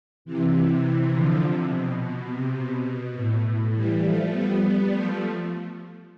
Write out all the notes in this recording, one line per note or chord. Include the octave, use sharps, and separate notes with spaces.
C3 E3
D3 F3
C3
B2
B2
C3
B2
A2
A2
E3 G3
F3 A3
G3 B3
F3 A3